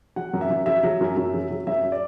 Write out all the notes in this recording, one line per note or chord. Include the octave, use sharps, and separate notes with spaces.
F#3 F#5
F#2
E5
F#2
F#3 E5
F#3
F#2
F#2
F#3
F#3
F#2 E5
D5